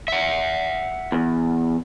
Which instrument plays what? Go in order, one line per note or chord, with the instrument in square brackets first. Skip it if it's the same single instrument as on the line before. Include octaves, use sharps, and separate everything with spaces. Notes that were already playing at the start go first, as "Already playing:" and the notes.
[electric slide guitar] E5 F#5
[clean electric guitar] E2